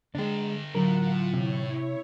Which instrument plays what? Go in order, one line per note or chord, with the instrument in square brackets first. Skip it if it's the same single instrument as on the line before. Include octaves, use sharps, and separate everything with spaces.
[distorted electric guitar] D3 G5 [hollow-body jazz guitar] G#3 D4
[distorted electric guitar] A2 [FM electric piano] D3 F#3 [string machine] F4 F#5 [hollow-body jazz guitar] A#4
[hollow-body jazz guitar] C3 [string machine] E4 C#5